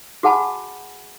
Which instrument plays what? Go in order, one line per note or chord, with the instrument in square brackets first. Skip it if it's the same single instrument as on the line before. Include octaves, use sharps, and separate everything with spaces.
[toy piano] F#4 G#4 F#5 G#5 A5 B5